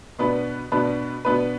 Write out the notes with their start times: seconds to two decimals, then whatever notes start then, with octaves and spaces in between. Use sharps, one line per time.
0.19 B2 B3 D4 B4
0.72 B2 B3 D4 B4
1.25 B2 B3 D4 B4